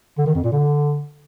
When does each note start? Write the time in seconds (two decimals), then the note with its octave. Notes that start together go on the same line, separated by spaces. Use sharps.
0.18 D3
0.26 D#3
0.35 F2
0.43 A#2
0.52 D3